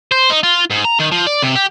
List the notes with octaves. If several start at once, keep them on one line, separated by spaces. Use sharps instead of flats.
C5
D#4
F4
G#2
A#5
D#3
F3
D5
C3
G4